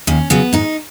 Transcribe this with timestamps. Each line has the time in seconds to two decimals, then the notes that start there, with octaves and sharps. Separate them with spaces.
0.07 D#2 C#4
0.30 C#3 F#3 B3
0.53 G#2 D#4